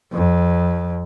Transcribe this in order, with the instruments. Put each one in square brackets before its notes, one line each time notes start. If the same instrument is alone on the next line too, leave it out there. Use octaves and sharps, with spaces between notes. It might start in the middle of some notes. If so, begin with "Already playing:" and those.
[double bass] F2